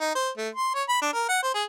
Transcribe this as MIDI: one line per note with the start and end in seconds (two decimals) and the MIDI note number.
0.01 0.11 63
0.15 0.30 72
0.38 0.49 57
0.55 0.72 84
0.74 0.83 73
0.89 1.00 83
1.02 1.10 62
1.14 1.25 70
1.29 1.43 78
1.43 1.53 72
1.55 1.64 68